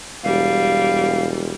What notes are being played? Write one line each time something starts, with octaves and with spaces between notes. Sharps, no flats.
E1 G3 F5